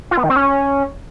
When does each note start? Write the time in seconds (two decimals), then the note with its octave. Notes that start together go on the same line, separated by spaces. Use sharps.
0.11 F4
0.17 B3
0.24 D#3
0.30 C4
0.36 C#4